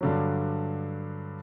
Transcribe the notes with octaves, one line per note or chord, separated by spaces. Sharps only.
G2 D3 F#3